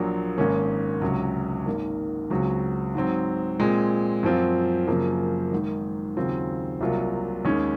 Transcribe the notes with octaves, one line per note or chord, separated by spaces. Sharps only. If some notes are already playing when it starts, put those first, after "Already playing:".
Already playing: A#1 A#2 F#3 A#3
G#1 G#2 D#3 A#3 C#4
C#2 C3 F#3 C#4
G#1 G#2 D#3 A#3
C#2 C#3 F#3 C4 F#4
G#2 F#3 C4
A#2 G#3 C4
F#2 F3 C4 F4
F#2 C#3 F3 A#3
G#1 G#2 D#3
D#2 C#3 F#3 C4 F4
C2 C3 F#3 A#3 F4
D#2 D#3 G#3 C#4